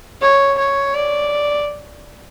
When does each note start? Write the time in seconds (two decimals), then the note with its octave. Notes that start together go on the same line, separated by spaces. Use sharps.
0.21 C#5
0.59 C#5
0.95 D5